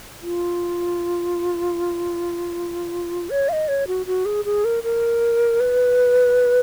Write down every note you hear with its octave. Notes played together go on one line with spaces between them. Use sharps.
F4
C#5
F5
D#5
C#5
F#4
F#4
G#4
G#4
A#4
A#4
B4